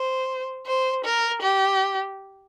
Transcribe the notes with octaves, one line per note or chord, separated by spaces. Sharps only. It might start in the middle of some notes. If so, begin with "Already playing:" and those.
Already playing: C5
C5
A#4
G4